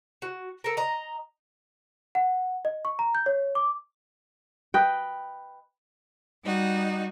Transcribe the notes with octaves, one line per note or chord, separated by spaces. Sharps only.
F#4
A4 A#4
D#5 A#5
F#5
D#5
C#6
A#5
G6
C#5
D6
B4 D#5 G5
G3 D#4 F#4